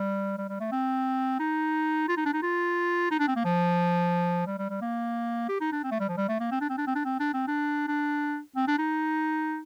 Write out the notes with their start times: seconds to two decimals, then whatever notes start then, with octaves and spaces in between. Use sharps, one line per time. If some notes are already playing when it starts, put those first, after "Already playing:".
Already playing: G3
0.38 G3
0.49 G3
0.60 A3
0.72 C4
1.40 D#4
2.08 F4
2.17 D#4
2.26 D4
2.33 D#4
2.43 F4
3.11 D#4
3.19 D4
3.28 C4
3.36 A#3
3.45 F3
4.47 G3
4.58 G3
4.70 G3
4.81 A#3
5.49 G4
5.61 D#4
5.72 D4
5.84 C4
5.91 A3
6.00 G3
6.09 F3
6.17 G3
6.29 A3
6.40 A#3
6.52 C4
6.61 D4
6.69 C4
6.78 D4
6.87 C4
6.96 D4
7.05 C4
7.20 D4
7.34 C4
7.48 D4
7.88 D4
8.56 C4
8.68 D4
8.78 D#4